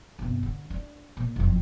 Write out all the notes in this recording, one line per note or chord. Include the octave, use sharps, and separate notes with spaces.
G1 C3
D3
D4
A#2
F#1 F2